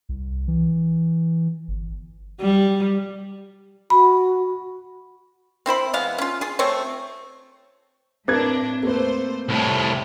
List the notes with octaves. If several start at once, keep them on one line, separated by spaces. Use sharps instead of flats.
C2
E3
G1
G3
F#4 B5
C4 E4 C5 B5
E3 G#3 B3 F5
C#4 F4
F4 G#4
A3 C4 C5 C#5
A2 C4 D4 A#4 B4 G#6
A3 A#3 B4 C5
C2 A2 A3 G4 C#5